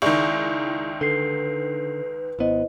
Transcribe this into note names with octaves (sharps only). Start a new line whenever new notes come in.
C#2 D#3 E4 D5 E5 C#6
D3 A4 B4 C7
G#1 B3 E4 C5 D#5